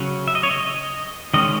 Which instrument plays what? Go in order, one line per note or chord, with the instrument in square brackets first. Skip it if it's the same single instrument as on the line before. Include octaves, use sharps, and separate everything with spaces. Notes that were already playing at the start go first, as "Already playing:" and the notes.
Already playing: [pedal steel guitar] C#3 F#3 C#4
E5
D#5
C#5
D#5
D#3 G#3 C#4 D#5